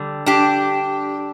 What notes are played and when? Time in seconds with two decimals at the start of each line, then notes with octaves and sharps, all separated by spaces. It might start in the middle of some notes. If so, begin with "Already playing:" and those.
Already playing: D3 G3
0.26 D4 G4